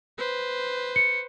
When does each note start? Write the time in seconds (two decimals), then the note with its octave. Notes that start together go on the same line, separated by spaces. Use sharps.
0.18 B4 C5
0.96 C#7